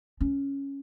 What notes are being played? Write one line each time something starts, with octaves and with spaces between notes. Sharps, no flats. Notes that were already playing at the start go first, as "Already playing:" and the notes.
C#4